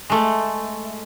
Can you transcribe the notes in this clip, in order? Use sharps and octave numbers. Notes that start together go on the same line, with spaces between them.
G#3 A3